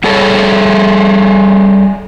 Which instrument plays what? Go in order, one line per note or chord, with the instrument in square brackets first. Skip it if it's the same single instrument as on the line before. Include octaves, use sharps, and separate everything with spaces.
[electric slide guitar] G3 G#4 A4 C#5 A5